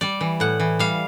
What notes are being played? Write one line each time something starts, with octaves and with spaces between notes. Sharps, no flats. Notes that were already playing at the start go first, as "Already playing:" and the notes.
G3 D5
E3
A2 F#5
E3
G3 F5